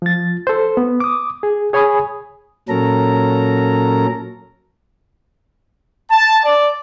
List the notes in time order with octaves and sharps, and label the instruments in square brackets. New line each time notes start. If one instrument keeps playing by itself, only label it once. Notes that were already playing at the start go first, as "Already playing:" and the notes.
[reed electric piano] F3 A6
A4 C5
B3
D6 D#6
G#4
G#4 C#5 G#5 B5 D#6
[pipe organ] A#2 F#3 C#4 A4 A#4 A#5
[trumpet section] A5
D5